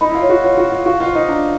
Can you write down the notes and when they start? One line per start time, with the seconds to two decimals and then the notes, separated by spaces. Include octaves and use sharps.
0.01 D#4 B5
0.09 E4
0.15 F4
0.22 C#5
0.29 F#4
0.44 F4 C#5
0.57 F#4
0.64 C#5
0.72 F4
0.85 F#4 F5
1.00 F4
1.07 C5
1.15 D#4
1.28 D4 A#5